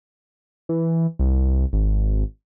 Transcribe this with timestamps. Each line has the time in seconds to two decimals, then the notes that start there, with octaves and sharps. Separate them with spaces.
0.69 E3
1.19 C2
1.73 G#1